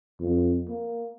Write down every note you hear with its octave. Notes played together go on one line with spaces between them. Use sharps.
F2
A#3